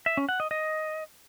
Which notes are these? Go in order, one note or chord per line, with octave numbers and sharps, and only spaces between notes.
E5
C#4
F#5
D#5
D#5